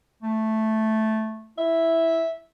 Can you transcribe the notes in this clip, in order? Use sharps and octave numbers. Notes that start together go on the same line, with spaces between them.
A3
E4 E5